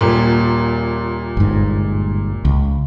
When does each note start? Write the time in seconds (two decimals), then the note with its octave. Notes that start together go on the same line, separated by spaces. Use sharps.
0.01 D#1 A#2
1.37 G1 G#2
2.45 C#2